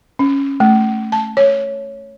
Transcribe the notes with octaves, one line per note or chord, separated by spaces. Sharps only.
C#4
A3
A5
C#5